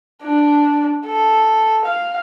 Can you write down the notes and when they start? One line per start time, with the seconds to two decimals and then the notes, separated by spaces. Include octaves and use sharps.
0.22 D4
1.06 A4
1.84 F5